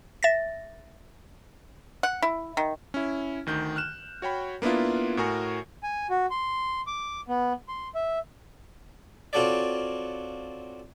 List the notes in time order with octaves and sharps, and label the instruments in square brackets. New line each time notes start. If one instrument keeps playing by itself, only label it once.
[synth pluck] E5 A6 A#6
[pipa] F#5
E4
D#3
[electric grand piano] C#4 E4
D2 D#3 G6
F6 F#6 E7
F#4 C#5 G5 B5
A#3 B3 D4 E4 F4
A2 F#4 A#4 G#5 C#6
[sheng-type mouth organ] G#5
F#4
C6
D6
B3
C6
E5
[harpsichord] C4 F4 F#4 A4 C#5 D5